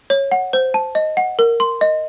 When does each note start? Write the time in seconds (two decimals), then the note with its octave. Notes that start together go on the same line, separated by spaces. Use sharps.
0.10 C#5
0.32 F#5
0.53 C5
0.74 A5
0.95 D#5
1.17 F#5
1.39 A#4
1.60 C6
1.81 D#5